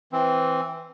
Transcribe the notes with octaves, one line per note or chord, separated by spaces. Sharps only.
E3 C4